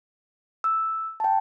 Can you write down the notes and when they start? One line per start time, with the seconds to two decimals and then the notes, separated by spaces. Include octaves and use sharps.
0.64 E6
1.20 G5 A5